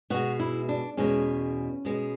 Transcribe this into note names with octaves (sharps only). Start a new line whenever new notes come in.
B2 G#3 F#4
E4
D4
E2 B2 G#3 C#4
B2 G#3